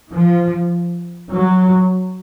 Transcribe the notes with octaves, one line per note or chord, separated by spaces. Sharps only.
F3
F#3